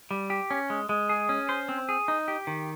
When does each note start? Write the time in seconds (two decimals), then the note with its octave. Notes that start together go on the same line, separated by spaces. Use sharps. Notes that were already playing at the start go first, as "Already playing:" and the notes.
0.11 G3
0.30 G4
0.51 C#4
0.70 G#3
0.89 G#3
1.09 G#4
1.29 C#4
1.49 C5
1.69 C4
1.89 G#4
2.08 D#4
2.28 G4
2.47 D#3